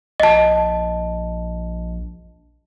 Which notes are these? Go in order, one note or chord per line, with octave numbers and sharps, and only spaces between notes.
A#1 D#5 A5